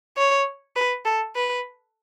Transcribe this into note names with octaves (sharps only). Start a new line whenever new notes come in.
C#5
B4
A4
B4